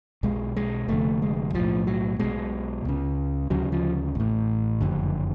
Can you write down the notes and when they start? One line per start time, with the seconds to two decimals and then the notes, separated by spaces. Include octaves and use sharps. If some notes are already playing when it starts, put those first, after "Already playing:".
0.23 B1 B2 G#3
0.56 G#3
0.88 F1 F2 D3 A3
1.22 G#3
1.54 B1 A2 F3
1.87 F#3
2.19 B1 B2 G#3
2.85 C#2 C#3
3.50 D2 C#3 F#3
3.72 F3
4.15 A1 A2
4.81 F#1 F2 D3